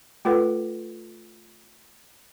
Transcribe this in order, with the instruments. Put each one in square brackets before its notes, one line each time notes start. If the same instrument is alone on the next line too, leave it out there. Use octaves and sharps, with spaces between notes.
[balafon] A3 F4 A4 B4 F#5